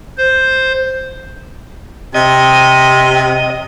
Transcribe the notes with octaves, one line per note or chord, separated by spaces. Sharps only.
C5
C3 D#5